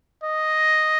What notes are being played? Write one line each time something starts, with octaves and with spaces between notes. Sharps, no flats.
D#5